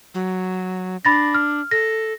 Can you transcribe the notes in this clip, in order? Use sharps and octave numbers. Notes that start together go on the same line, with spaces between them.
F#3
D4 B5 A6 A#6
F6
A4 A#6